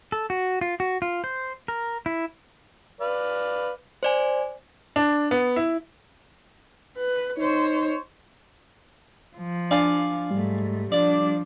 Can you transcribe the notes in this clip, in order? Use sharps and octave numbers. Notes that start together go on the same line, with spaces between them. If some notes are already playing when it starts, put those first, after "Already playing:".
A4
F#4
F4
F#4
F4
C5
A#4
E4
B4 D5 F5
C5 D5 G#5
D4
B3
E4
B4
D#4 C5 C#5
F3
D4 D5 F5 G#5
G#2 G3 A3
F3 D4 D5